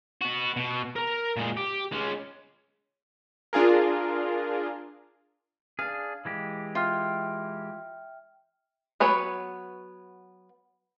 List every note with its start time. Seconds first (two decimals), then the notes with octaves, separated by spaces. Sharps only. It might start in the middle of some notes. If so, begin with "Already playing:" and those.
0.22 B3 F#4
0.57 B2
0.96 A#4 A#5
1.37 A#2 G#3
1.57 G4
1.92 G#3 C#4
3.53 D4 F4 G#4 A#4
5.79 D4 G#4 F5
6.25 E3 G#3 G4
6.75 F4 E5 G5 F6
9.00 F#3 B3 B4 C#5